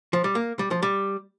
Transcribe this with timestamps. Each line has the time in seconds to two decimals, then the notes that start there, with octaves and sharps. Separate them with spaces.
0.13 F3
0.24 G3
0.35 A#3
0.59 G3
0.71 F3
0.83 G3